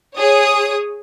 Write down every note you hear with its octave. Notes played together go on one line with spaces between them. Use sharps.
G#4 C#5 D#6